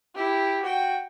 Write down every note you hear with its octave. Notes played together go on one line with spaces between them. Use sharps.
E4 G4
F#4 G5